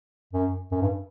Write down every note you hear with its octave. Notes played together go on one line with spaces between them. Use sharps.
F#2
F#2
G2